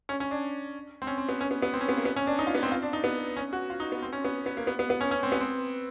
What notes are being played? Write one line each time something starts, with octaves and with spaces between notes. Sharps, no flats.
C#4
C#4
D4
C4
C#4
C4
B3
C#4
B3
B3
C4
C#4
B3
A#3
B3
C#4
D4
D#4
F4
B3
C4
F4
D4
D#4
B3
C#4
F#4
F4
D#4
B3
C4
C#4
B3
B3
A#3
B3
B3
B3
C#4
C#4
C4
B3
C4